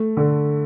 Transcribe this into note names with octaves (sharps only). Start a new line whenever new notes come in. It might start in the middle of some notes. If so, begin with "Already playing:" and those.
Already playing: A3
D3